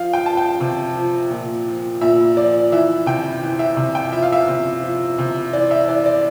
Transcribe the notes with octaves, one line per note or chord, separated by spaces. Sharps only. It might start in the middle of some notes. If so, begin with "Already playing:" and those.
Already playing: F3 F5
G5
F3 A5
G5
C3
F3
A#2
F3
A#2 E5
F3 D5
E3 E5
C3 G5
E3
E5
C3
G5
F3 E5
F5
E5
C3
F3
C3
E3 D5
E5
E3 D5
D5